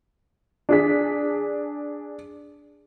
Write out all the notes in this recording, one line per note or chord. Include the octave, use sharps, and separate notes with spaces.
D4 G#4 B6